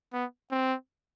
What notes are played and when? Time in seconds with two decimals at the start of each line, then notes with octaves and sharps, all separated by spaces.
0.13 B3
0.51 C4